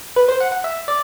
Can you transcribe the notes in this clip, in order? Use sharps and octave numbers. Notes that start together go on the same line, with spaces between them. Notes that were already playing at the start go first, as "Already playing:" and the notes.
B4
C5
F#5
F#5
E5
D5